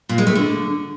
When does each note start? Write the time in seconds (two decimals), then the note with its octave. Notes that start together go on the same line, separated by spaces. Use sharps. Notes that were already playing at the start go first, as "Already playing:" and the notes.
0.09 A#2
0.18 G#3
0.27 A3
0.35 D3